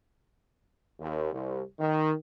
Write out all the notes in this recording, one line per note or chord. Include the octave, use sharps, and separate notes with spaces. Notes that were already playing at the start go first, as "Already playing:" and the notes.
D#2
C2
D#3